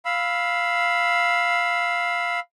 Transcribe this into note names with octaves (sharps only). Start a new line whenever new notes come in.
F5 B5 E6